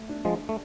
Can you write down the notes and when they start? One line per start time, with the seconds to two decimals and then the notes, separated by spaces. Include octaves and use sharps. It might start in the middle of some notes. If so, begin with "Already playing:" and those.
Already playing: A3
0.09 D4
0.25 F3 G#3
0.49 A3